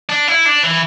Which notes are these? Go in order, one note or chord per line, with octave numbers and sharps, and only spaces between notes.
D4
E4
D4
E3